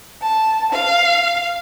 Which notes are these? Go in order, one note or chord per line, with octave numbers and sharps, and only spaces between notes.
A5
F5